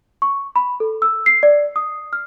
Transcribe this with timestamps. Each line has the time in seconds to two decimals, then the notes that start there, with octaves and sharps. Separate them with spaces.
0.22 C#6
0.56 B5
0.80 A4
1.02 E6
1.26 C7
1.43 D5
1.76 D#6
2.13 F6